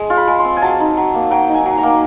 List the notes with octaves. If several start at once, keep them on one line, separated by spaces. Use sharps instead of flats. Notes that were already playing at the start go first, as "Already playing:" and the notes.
Already playing: G#3
F4
B5
G#3
C6
C4
G#5
F#3 A5
D#4
F#3
A#3
F#3 G5
D#4
G#5
F#3
A#5
A#3